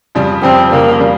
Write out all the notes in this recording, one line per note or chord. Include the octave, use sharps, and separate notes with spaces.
F2 C#3 G3
F2 C#3 G3 C4
F2 C#3 G3 A#3
C#3 G3